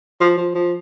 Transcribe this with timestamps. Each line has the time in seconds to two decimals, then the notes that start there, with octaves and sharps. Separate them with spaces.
0.21 F3
0.38 F3
0.55 F3